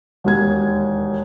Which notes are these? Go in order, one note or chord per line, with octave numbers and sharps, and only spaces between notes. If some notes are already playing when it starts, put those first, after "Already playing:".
E1 D#2 G#6